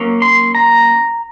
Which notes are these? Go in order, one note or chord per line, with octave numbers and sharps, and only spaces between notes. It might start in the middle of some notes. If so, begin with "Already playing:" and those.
Already playing: F#3 A#3 C#4
C6
A#5